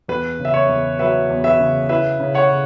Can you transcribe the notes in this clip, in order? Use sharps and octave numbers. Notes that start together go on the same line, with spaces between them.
E2 B4
C#3
E5
C#5
E2
F#3 B4 E5
E2
B4 E5
C#3
E4 B4 E5
C#3
C#5 F#5
C#3